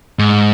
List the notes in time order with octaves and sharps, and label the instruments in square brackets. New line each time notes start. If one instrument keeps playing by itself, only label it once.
[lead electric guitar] G#2